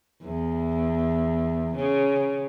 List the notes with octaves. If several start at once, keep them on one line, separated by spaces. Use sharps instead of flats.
E2
C#3